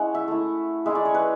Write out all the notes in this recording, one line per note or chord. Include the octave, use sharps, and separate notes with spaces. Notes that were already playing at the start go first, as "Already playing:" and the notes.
Already playing: G#3 C#4 E4 F#5
E5
A3 E4
G#3 C#4 E4 E5
D5
C#5
B4